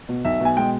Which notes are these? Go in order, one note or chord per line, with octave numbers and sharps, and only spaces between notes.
B2
B1 E5
B2
G#5
G#3 G5